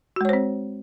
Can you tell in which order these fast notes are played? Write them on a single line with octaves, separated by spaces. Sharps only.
F#4 G#3 C#5 C5 C4